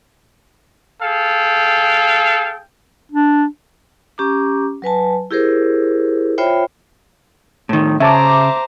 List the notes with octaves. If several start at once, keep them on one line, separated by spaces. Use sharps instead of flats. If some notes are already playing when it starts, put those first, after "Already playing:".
G#4 A4 F5 G5
D4
C#4 G4 A#5 D6
F#3 B4 G#5 A5
E4 G4 G#4 A#4 C5
F4 C5 C#5 E5 G5 B5
A2 D#3
C#3 C5 E5 A5 A#5 D6